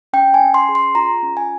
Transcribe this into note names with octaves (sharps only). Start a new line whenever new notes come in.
C#4 G5
G#5
C#4
C6
G#4
C6
F4 A#5
C#4
G#5